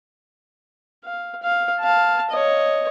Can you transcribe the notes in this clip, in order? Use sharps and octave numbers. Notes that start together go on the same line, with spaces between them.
F5
F5
F5 A5
C#5 D#5